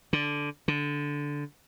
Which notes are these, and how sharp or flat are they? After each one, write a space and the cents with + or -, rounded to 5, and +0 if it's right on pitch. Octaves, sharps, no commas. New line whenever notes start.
D3 -5
D3 -10